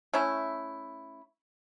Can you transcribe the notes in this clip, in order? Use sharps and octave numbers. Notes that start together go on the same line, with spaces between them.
A3 C#4 E4